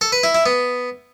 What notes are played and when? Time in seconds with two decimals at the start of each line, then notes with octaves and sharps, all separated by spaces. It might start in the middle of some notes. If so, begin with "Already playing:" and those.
0.01 A4
0.12 B4
0.23 E4
0.35 E4
0.46 B3